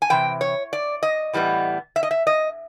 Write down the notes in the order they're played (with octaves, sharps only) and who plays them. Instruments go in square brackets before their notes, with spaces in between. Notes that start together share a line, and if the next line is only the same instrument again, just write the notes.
[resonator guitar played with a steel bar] G#5
C3 E3 G5
C#5
D5
D#5
A2 E3 G3 B3
E5
D#5
E5
D#5